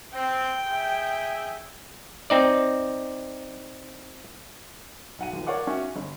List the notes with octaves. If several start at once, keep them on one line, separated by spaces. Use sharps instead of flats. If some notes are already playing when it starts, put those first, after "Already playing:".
C4 G5
G#4 E5
C4 D#4 D5
B1 F#5 D#7
D#2 F3
A#4 C#5 D5 F5 F#5 D6
C#4 F#4 E5 F#5
G1